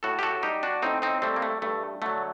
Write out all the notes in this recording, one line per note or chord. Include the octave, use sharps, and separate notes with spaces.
A2 F#4 A4
G4
F#4 A4
G3 D#4 G4
D4 F#4
A2 C4 D#4
C4 D#4
G3 A3 C4
A#3
A3
G2 A3
D3 F#3 A3